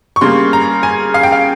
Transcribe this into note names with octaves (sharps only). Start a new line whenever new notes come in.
C#6
C#3 G3 A#3 C6
A#5
G#5
F5
G5
F5